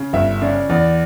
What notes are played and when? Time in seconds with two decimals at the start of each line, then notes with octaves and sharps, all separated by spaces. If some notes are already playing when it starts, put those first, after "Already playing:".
Already playing: C#3
0.13 G1 E5
0.41 C#3 D5
0.69 E2 D5